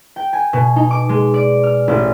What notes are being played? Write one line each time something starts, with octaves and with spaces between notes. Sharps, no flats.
G5
G#5
B2
D#4
D6
G#3
D5
F6
A1